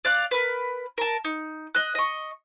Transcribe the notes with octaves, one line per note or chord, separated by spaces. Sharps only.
D5 F5 F#6
A#4 B4
A#4 A5
D#4
D#5 F#6
D#5 C#6